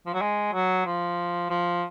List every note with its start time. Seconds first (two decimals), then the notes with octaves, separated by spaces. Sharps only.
0.06 F3
0.14 F#3
0.21 G#3
0.53 F#3
0.86 F3
1.50 F3